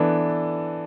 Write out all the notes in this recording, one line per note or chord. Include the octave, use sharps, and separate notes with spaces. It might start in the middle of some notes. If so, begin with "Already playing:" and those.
Already playing: E3 B3 D4 A4